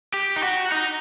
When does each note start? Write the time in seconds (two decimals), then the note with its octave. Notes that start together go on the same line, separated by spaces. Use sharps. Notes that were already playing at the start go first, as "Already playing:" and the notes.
0.14 G4
0.36 D#4
0.43 F#4
0.72 D#4